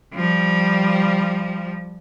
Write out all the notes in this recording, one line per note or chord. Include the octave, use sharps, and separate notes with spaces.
F3 G3